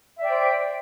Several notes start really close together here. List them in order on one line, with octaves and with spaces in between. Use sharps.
E5 D5 G5 C5